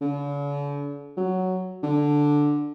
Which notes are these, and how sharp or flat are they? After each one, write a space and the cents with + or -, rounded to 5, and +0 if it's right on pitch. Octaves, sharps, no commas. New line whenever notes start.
D3 -45
F#3 +5
D3 +0